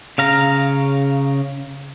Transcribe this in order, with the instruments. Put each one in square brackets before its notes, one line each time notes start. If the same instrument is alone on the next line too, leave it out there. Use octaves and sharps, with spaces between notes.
[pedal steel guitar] C#3 F5 A#5